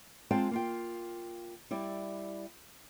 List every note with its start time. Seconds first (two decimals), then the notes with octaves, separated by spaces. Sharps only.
0.31 G#3 C4 F4 G5 A5
0.51 A#3 F4 G5
1.71 G3 E4 D5